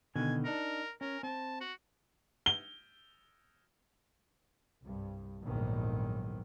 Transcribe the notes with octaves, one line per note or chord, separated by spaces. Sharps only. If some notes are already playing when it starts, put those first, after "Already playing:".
B2 D3 D#3 G#5
D4 D#4 A#4
C#4 A#4
C4 A5
F#4
G7
C2 G2
A#1 E2 G#2 D3 D#3 F#3